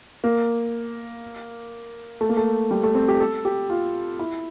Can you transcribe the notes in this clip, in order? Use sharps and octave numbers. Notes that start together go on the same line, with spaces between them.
A#3
A3
A#3
A3
G3
A3
C4
G4
A4
G4
F4
E4